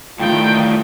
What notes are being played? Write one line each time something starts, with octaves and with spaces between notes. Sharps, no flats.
A2 D#3 G3 A3 D#4 F4 G5